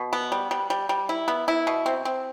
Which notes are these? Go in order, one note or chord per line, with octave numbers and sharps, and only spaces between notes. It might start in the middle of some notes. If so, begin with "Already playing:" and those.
Already playing: B2
B3
G3
G3
G3
G3
E4
B3
E4
B2
C4
C4